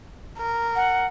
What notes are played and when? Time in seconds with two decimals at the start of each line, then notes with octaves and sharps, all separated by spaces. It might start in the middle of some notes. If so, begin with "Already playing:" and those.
0.38 A#4
0.76 F#5